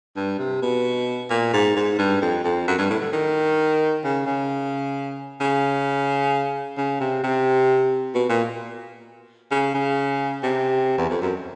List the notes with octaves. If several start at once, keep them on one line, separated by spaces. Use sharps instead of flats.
G2
C3
B2
A#2
G#2
G#2
G2
F2
F2
F#2
G2
A2
D3
D#3
C#3
C#3
C#3
C#3
C3
C3
B2
A#2
C#3
C#3
C3
E2
F2
F#2